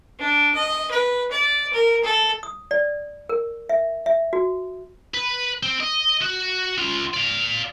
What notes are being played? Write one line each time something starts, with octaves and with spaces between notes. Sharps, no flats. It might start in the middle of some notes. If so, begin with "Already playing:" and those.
D4
D#5
B4
D5
A#4
A4
D#6
D5
A#4
E5
E5
F#4
B4
C4
D#5
F#4
C#2 F4
D5 F5